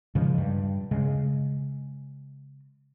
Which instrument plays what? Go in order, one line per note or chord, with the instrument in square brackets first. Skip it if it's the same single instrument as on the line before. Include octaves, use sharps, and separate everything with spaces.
[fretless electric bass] C#3 F3 G#3
G2
C#3 G#3